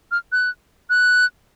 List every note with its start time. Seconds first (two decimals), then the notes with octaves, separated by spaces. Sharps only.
0.11 F6
0.32 F#6
0.90 F#6